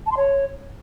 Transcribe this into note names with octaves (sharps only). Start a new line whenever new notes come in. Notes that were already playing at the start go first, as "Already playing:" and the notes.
A5
C6
C#5